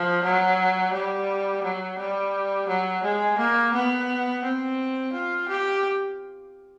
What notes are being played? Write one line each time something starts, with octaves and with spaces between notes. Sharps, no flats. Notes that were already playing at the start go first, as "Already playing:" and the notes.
Already playing: F3
F#3
G3
F#3
G3
F#3
G#3
A#3
B3
C4
F4
G4